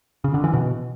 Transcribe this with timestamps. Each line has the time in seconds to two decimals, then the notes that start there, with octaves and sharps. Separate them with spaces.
0.24 C#3
0.34 D3
0.44 E3
0.53 B2